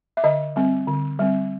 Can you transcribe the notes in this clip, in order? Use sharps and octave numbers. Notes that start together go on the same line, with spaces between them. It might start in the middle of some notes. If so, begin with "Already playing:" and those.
E5
D3 D#5
G3 C4
D3
G3 C4